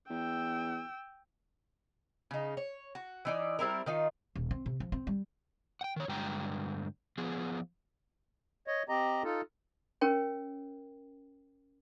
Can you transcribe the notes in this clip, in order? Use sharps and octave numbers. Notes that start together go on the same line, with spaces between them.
E2 G5 E6
C#3 D#4
C#5
F#4
E3 D#4 D5
G3 C4 E4 A#4
D#3 D#4 F4
D#1
C4
C3
F3
C4
G3
F#5 G5
D#3 C#5
G2 D3 F#3 G#3 G5 A#5
F3 B3 G#4
C#5 D#5
C4 G4 D#5 A#5
D#4 F4 A4
C#4 A#4 C#5 G5